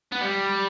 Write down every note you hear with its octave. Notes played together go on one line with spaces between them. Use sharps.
B3
G3